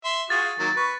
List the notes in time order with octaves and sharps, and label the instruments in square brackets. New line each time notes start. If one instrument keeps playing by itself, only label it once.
[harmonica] E5 C6
[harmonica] F4 F#4 G#4 [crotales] A6
[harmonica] D#3 F#3 A#3
B4 C#6